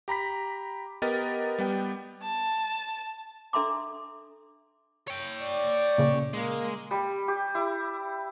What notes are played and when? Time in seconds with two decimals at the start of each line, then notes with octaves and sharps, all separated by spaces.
0.08 G4 A#5 B5 B6
1.02 B3 G4 A#4 D#5 A6
1.59 G3 B3 G5
2.23 A5
3.53 D4 A4 E5 A#5 C6 D6
5.08 C#5 G5
5.40 D5
5.98 A#2 C#3
6.34 G#3 A#3
6.91 G3
7.28 G4
7.55 E4